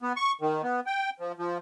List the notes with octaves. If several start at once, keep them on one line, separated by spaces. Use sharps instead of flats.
B3
C#6
D#3
B3
G5
F3
F3